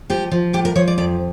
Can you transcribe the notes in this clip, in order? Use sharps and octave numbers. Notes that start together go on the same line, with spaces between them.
F3 G4
F3
A2 G4
A#4
F3 C#5
D5
F2 D5